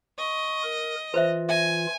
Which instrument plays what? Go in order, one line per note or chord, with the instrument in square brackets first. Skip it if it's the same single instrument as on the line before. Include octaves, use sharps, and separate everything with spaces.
[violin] D#5 [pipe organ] C#6
[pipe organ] A#4
[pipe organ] E3 F4 [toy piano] B4 C5 E5
[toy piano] E5 [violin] G#5